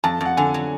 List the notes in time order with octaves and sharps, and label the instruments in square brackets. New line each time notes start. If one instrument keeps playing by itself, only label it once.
[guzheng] F2 [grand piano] A5
[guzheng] F2 [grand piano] F#5
[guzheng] D3 [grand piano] G#5
[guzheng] F#3